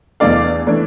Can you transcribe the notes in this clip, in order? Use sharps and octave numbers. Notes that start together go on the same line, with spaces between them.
E2 E3 A3 D4 D5 F5
E3 A3 D4